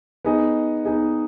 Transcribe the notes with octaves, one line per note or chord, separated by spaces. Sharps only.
B3 D#4 G#4 D#5
B3 D#4 G#4 D#5